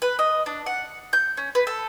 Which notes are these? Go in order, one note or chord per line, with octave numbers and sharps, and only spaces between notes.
B4
D#5
D4
F#5
G6
C#4
B4
A4